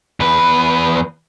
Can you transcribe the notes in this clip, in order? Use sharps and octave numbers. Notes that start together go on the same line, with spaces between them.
E2 B4